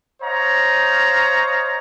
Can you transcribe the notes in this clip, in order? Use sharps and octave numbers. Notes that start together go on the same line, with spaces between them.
C5 C#5 D#5 F5 A#5